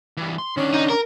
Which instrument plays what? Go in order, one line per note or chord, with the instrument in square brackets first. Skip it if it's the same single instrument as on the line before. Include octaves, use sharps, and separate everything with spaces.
[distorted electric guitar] E3 G3
C6
[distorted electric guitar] D#3 D4 [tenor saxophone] C#4
[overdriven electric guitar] D#4
A#4